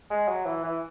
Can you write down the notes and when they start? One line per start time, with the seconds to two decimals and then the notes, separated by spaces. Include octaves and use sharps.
0.10 G#3
0.28 F#3
0.46 E3
0.64 E3